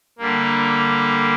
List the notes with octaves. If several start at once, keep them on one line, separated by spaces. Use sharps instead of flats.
D3 G3 A#3